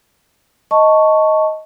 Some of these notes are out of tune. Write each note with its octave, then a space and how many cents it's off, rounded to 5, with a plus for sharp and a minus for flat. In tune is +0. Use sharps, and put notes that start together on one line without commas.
D#5 +10 A5 +10 C#6 +0